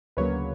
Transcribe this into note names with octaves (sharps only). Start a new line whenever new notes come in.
D2 C#3 F#3 A#3 B4 C#5